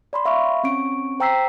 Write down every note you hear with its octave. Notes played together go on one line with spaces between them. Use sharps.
D5 B5 C6
E5 F5 B5 C#6
C4 C#4 C#6 D7
C5 G5 A#5 E6 B6 C7